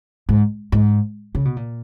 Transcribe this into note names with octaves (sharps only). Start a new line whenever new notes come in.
G#2
G#2
C#3
B2
A#2